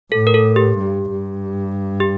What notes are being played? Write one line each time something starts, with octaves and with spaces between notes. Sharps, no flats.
A2 A4
A#4
A4
G4
G2
G2
G4